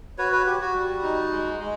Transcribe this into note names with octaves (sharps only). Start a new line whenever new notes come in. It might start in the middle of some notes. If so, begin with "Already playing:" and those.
F#4 B4 C#5
B4 C#5
F#4 G4
F#4
G3
D#4
G#3
G#3